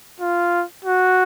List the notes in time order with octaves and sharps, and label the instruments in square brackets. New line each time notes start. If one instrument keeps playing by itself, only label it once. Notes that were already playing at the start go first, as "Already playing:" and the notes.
[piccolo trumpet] F4
F#4